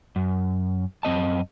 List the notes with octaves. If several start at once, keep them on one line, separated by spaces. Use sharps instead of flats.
F#2
F#2 C4 D#5 A5